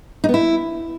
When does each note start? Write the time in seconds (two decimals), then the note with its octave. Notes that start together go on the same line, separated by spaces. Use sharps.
0.24 D#4
0.29 B3
0.34 E4